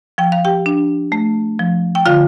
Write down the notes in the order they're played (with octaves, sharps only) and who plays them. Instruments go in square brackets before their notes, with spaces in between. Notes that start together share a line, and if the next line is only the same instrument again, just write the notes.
[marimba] F3 G5
F5
G4 G5
D4
A3
F3
G5
D3 F4 F5